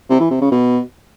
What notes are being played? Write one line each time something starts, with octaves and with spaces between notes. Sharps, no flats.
C3
E3
C3
C#3
B2